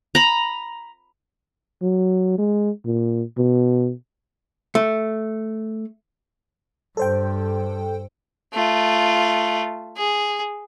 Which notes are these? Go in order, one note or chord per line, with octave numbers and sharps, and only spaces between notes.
A#5 B5
F#3
G#3
A#2
B2
A3
G2 A4 C5 G5
A3 F4
G#4